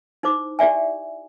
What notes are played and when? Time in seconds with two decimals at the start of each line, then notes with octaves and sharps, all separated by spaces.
0.23 D#4 E4 C5 D6
0.59 E4 G4 D5 E5 G#5